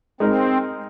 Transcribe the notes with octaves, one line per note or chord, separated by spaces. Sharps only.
G#3 C4 D#4 A#4